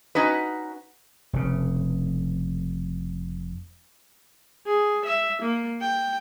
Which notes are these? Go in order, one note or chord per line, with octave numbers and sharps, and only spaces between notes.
C#4 D#4 F#4 B4
F1 C#3
G#4
E5
A#3
G5